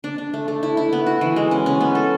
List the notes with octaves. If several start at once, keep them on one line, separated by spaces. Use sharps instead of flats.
D4
D4
A3
A3
E4
E4
B3
F#4
E3
G#3
C#4
C#4
B3
A4